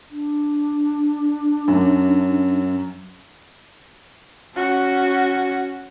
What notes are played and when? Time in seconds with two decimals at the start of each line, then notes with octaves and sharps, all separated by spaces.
0.11 D4
1.68 F#2
4.55 C#4 F#4